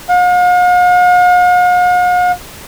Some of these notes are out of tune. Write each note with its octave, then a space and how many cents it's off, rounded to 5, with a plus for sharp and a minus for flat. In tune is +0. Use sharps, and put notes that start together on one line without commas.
F5 +45